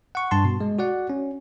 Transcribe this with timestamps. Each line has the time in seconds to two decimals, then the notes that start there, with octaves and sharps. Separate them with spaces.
0.15 F#5 C#6
0.31 G2 A5 C6
0.44 B2
0.61 G#3
0.79 F#4 D5 F#5
1.10 C#4